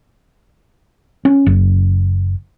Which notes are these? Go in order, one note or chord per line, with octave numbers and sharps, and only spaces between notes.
C#4
F#1